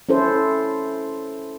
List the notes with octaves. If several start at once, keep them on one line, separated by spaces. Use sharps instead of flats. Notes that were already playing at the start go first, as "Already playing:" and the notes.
C#4 E4 A4 C5